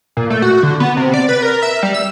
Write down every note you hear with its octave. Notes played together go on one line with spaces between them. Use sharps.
A#2
A3
F#4
D3
B3
C3
D5
B4
A#4
E5
G3
E6